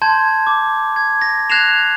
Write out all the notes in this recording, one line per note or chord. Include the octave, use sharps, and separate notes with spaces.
A5 C6 G6 G#6
D6
G#6
A#6
F#6 G#6 A#6 C7 E7 F7